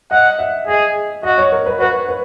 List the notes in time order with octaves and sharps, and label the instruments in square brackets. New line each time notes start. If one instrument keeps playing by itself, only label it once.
[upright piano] D#5 [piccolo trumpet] F#5
[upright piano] E5
[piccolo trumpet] G#4 [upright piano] D#5
[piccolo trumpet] F#4 [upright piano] D#5
[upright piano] C#5
A#4
B4
[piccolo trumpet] F#4 [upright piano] B4
[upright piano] B4